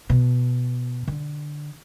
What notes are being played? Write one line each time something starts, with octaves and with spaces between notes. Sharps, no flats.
B2
D3